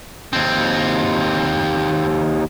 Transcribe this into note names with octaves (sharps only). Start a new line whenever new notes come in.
D#2 C4